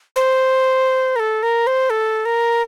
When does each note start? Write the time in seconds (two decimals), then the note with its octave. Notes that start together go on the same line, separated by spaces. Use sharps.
0.16 C5
1.16 A#4
1.19 A4
1.43 A#4
1.67 C5
1.90 A4
2.25 A#4